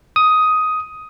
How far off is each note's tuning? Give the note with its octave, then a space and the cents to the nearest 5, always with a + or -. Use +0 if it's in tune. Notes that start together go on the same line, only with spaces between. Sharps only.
D#6 +10